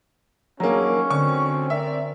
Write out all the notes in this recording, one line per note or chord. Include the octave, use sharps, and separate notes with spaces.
D#2 F#3 A#3 C#4 D4 G#4 A#5
D2 D3 C4 C#6
C4 A#4 D5 E5